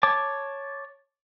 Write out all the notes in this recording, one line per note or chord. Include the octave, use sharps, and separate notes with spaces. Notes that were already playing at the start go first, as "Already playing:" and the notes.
C#5 A5 D6